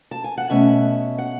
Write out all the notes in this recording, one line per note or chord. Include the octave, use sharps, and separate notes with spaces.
A5
G#5
F#5
B2 A3 C#4 E5
F#5